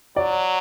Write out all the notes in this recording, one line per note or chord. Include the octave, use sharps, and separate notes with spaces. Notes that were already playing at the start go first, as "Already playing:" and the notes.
F#3 D5